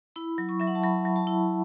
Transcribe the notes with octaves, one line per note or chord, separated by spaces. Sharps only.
E4 B5
F#3
C#6
F#3 E5
F#5
A5
F#3 B5
F#3
A5
E4